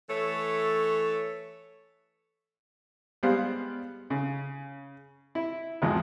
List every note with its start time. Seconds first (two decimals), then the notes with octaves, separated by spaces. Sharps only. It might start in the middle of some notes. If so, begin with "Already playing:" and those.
0.09 E3 A3 A4 C#5
3.23 G3 G#3 B3 G4 C5 F5
4.10 C#3
5.35 E4
5.82 G#1 E2 F3 G#3